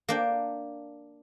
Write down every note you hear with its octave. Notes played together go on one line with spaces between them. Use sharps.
A#3 D4 G5